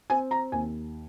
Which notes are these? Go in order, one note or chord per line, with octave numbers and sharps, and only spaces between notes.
C4 G#5
A#5
D#2 G#5